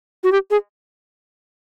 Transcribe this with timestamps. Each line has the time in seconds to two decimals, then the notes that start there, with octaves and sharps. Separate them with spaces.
0.24 F#4
0.32 G4
0.51 G#4